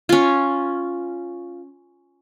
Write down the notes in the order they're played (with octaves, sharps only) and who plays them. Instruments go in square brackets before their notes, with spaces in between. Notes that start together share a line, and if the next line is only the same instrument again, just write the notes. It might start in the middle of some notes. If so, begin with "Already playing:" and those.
[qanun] C#4 F4